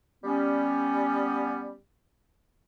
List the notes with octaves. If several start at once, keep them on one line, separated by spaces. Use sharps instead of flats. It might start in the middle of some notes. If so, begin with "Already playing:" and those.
G3 B3 C#4